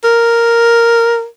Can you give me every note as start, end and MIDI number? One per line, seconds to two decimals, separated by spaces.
0.04 1.26 70